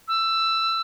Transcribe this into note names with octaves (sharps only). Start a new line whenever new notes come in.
E6